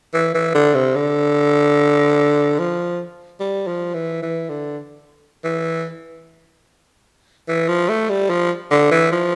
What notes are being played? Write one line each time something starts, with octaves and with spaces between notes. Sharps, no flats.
E3
E3
D3
C3
D3
F3
G3
F3
E3
E3
D3
E3
E3
F3
A3
G3
F3
D3
E3
F3